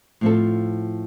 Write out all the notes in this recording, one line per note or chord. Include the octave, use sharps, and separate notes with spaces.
A2 F3 C4 F4 A4